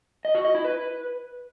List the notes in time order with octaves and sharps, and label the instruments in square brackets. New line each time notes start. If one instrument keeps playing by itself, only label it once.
[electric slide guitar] D#5
F#4
D#5
E4
B4